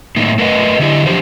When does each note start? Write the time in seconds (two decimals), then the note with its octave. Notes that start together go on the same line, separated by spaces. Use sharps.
0.16 A2 A#3 D#4
0.38 A3 A#4 B4 D#5 F#5
0.79 D3 C#4 D4 E4 G4 D#5
1.06 F3 F#3 D4 G4 A#4 C5